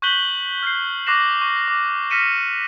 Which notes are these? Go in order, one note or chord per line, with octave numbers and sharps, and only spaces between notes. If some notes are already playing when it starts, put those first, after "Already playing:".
C#6 F#6 G6 B6 F#7 G7
F6 G6 B6 C7
C#6 D6 F#6 A#6 C7 E7
C#6
D6
F6 A#6 B6 C#7 D#7 E7